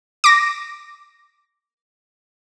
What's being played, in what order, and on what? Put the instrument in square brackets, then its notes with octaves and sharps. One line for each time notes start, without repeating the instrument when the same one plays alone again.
[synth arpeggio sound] D6 A#6